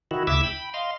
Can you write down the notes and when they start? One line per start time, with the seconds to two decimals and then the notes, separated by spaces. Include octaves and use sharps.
0.11 D#3 E4 F#4
0.27 D2 C#3 E4 E5 D6 E6
0.44 G5 B5
0.74 D#5 F5 C6